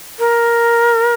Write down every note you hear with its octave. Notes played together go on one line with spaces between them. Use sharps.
A#4